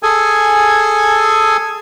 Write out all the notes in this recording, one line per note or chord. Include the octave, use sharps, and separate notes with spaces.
G#4 A4 G#5